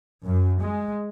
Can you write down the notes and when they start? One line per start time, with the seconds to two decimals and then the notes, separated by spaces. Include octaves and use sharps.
0.25 F#2
0.61 G#3